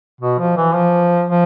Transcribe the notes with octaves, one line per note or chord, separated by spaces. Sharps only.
B2
F3
E3
F3
F3